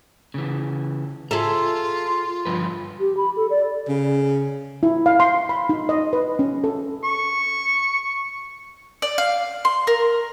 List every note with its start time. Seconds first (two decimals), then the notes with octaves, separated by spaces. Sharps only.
0.34 C#3 E3
1.31 F4 G#4 A4 E5 A#5
2.45 G2 F3 B4
3.00 G4
3.17 B5
3.36 A4
3.50 D5
3.89 C#3
4.83 E4
5.06 F5
5.20 C6
5.49 B5
5.69 D#4
5.89 D#5
6.13 B4
6.39 C#4
6.64 A4
7.04 C#6
9.02 D5
9.18 F5
9.65 C6
9.87 A#4